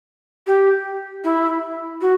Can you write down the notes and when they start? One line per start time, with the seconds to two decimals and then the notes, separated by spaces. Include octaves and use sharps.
0.47 G4
1.24 E4
2.01 F#4